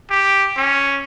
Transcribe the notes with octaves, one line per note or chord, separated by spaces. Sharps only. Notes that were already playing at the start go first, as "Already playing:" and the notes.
G4
C#4